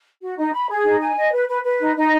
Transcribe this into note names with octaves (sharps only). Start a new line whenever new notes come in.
F#4
D#4
B5
G#4
D#4
G#5
D#5
B4
B4
B4
D#4
D#4